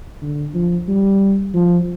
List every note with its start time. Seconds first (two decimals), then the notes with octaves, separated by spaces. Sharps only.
0.22 D3
0.54 F3
0.88 G3
1.54 F3